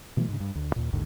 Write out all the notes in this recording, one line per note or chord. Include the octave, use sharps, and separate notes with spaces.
B2 E3 F#3 A3
G#2 C#3
G2
D2
D#2 A#2
A1 D#2 G#2 D3